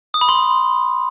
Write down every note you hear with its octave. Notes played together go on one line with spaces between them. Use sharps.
D#6
B5
C6